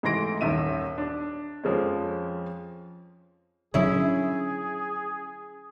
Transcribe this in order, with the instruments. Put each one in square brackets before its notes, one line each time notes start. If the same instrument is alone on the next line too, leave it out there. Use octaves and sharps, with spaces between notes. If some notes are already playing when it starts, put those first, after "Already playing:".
[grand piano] G#2 E3 A3 C6 A#6 D7
D#1 D#3 E5 D#7
D4
F2 F3 G#3 C#4
[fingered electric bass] D3 F#3 D4 [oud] C#4 E4 [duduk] G#4